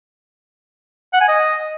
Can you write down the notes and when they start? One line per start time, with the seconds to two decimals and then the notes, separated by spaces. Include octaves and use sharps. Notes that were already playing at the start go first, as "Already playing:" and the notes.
1.13 F#5
1.21 G#5
1.28 D#5